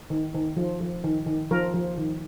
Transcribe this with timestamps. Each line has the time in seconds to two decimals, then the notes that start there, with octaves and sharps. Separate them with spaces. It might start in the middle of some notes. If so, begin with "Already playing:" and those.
0.10 D#3
0.34 D#3
0.57 F3
0.80 F3
1.04 D#3
1.27 D#3
1.51 F3 A#4
1.74 F3
1.98 D#3